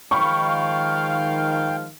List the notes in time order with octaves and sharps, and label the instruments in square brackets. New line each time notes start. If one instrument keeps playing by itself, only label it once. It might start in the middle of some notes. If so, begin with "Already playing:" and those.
[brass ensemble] D#3 [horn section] F3 G#3 F5 [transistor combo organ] G5 [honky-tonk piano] B5 C#6